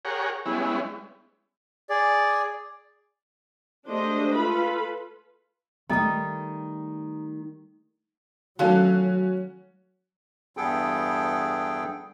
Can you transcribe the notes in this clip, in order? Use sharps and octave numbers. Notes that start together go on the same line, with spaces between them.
G4 G#4 A#4 C#5 F#5
G3 G#3 B3 C#4 E4
G#4 D5
G#3 A3 D4 G4 C5 D#5
F4 A4 B4 B5
D#3 G3 A3 A4 D#5 G5 A#5 D#6
D#3 F#3 A3 C#4 F4 F#4 A4
E2 G2 B3 G#4 A4 G5